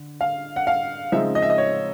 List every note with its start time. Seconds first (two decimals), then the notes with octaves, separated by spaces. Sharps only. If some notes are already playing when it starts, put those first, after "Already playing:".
Already playing: D3
0.21 F5
0.56 F#5
0.67 F5
1.12 C#3 F3 G#3 C4 D#4 E5
1.35 D#5
1.42 E5
1.50 D#5
1.58 C#5